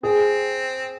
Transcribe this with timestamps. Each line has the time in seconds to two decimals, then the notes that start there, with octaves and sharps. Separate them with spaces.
0.03 C4 G#4